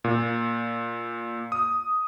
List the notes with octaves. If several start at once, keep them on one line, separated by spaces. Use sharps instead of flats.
A#2
D#6